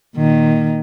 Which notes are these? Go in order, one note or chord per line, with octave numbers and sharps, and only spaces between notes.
A#2 D#3